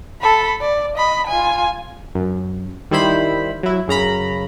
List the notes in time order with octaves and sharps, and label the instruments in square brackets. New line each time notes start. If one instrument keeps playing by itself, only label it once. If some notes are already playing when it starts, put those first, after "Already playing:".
[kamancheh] A4 B5
D5
D#5 B5
F4 G#5
[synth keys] F#2
D#3 G3 E4 C5 B5
F#3 E4
F#2 C#3 A#5 B5